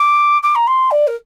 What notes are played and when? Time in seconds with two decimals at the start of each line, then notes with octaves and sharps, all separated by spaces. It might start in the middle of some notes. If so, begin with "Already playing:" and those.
Already playing: D6
0.43 D6
0.55 A#5
0.67 C6
0.91 D5
1.07 A#4